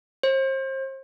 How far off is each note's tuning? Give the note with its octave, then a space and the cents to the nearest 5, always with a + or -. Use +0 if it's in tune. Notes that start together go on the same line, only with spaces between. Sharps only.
C5 +35